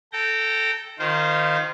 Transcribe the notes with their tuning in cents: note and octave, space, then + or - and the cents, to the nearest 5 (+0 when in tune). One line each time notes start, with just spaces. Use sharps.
A4 +0 G5 -15 A#5 -25
D#3 -20 F4 +0 C5 -15